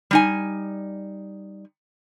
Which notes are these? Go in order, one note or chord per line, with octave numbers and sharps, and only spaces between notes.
G3 D#4 G#5